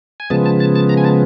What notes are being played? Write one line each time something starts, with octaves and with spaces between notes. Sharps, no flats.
G#5
C#3 F3 G#3 B3 A5
A5
A5
A5
A#5
G#5
A5